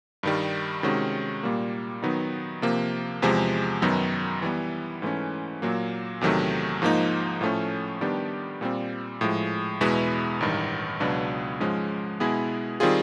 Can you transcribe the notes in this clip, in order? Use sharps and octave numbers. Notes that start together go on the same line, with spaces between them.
G2 D#3 G3
C3 D#3 G#3 C#4 F#4
A#2 G3 A#3
D#3 F#3 B3 D#4
C3 F3 A#3
E2 C3 F3 G#3
F#2 D#3 F#3 B3 D#4
E3 G3 B3
G#2 E3 A3 C#4
A#2 F#3 A#3
E2 C3 D#3 F#3 A3
G#2 F3 A#3 D#4
A2 F3 A3 C#4
D#3 G3 B3 D4 G4
A#2 G3 C4
A2 F3 G#3
E2 B2 G#3 B3 E4
A1 G2 D#3
C#2 B2 F#3 B3 D4
G#2 F3 G#3 C#4
B2 G#3 B3 E4 G#4
D#3 G3 C4 F4 G#4